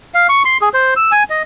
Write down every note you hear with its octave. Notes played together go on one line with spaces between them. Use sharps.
F5
C#6
C6
G#4
C5
E6
G#5
D#5